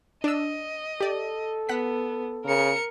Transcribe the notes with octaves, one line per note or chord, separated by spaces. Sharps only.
D4 D#5 E6
G4 A4 D5
B3 F#5 B6
C#3 A#4 C#7